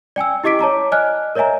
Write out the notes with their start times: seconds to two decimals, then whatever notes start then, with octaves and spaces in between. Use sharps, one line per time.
0.16 D5 G5 G#5 E6
0.44 E4 G4 D#5 D6 B6 D7
0.59 C#5 A5 A#5 D6
0.92 D5 D#5 G#5 F6 F#6
1.35 A#4 C#5 D#5 E5 G#5 A#5